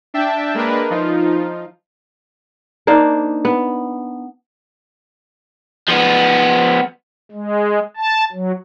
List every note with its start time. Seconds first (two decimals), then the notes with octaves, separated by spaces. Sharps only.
0.14 D4 E5 G5 A5
0.54 G#3 A#3 D4 A#4 B4
0.90 F3 D#4 F4
2.87 A#3 D4 D#4 C5
3.45 B3
5.88 F3 B3
7.32 G#3
7.97 A5
8.32 F#3